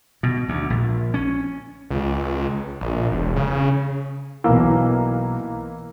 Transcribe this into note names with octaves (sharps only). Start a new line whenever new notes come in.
B2
D2
A#1
C#4
C#2
A#1
E1
C#3
B1 E3 A#3 E6